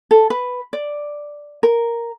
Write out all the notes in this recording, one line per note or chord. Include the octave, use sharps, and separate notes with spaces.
A4
B4
D5
A#4